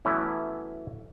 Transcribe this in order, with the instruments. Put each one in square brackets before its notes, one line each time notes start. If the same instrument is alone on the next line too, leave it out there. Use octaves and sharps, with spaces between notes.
[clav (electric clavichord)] E3 F#3 A3 B3 C#4 E4